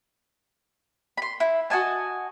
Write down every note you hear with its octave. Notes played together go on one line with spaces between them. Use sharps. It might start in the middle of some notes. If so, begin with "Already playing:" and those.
B5 C6
E4
F#4 D#5 G#5 A5